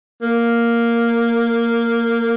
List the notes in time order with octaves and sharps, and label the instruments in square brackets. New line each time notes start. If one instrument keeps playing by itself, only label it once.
[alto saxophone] A#3